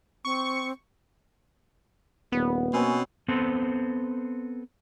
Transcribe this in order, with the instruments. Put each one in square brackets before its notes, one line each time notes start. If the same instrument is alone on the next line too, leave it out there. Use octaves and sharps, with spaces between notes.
[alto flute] C4 [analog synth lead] C#6
[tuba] D#1 [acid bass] B3
[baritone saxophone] B2 [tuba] A#3 [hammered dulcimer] C4 C#4 G#5
[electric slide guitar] B3 C4 A4 C5